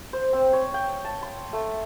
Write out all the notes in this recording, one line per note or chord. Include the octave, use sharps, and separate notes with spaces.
C5
C4
C#5
G5
A5
C6
A3